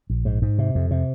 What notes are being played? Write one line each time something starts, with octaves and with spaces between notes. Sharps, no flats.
A#1
G#2
G#2
C3
F2
C3